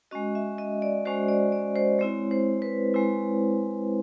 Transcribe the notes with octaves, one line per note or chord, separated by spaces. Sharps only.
G#3 C#4 F#4 D#5
E5
D#5
D5
G#3 C#4 F#4 C5
D5
D5
C5
G#3 C4 E4 C#5
C5
B4
G#3 C4 E4